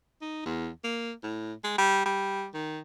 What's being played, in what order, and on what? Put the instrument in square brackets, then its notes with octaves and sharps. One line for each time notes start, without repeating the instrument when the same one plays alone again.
[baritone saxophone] D#4
E2
A#3
A2
G#3
G3
G3
D#3